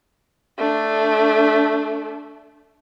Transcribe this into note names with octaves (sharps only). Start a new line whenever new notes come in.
A3 D4